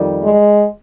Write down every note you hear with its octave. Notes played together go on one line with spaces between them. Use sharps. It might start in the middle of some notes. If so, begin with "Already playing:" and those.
Already playing: F2 D#3 G3
G#3